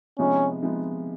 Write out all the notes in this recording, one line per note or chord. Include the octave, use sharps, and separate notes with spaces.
C3 F3 G#3 B3 C#4 D#4
C3 F3 G#3 B3 D#4